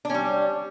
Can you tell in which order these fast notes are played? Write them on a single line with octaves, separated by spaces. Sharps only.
D4 C#4 G3